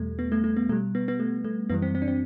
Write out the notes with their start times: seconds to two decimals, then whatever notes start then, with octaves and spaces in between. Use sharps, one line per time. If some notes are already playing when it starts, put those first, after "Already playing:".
Already playing: E2 B2 G3 A3
0.19 B3
0.32 A3
0.44 A3
0.57 B3
0.69 B2 A3
0.72 G3
0.95 B3
1.08 B3
1.20 A3
1.44 A3
1.69 F#2 E3 G3 B3
1.82 C4
1.95 C4
2.02 D4
2.08 C4